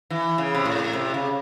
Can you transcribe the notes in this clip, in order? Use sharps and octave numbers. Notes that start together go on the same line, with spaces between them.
E3
C#3
C3
A2
C3
C#3